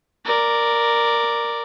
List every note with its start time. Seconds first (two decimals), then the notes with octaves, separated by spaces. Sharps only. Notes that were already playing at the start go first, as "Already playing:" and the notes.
0.25 A#4 D5